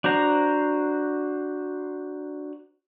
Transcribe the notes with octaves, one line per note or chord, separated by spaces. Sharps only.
D4 F#4 C5 A#5